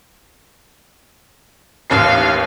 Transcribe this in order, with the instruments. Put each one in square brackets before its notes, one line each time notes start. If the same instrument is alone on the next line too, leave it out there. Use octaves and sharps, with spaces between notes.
[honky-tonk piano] A1 D#2 C7 [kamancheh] F5